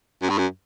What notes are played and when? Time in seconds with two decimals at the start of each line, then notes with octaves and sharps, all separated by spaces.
0.22 F#2
0.30 G2
0.38 F#2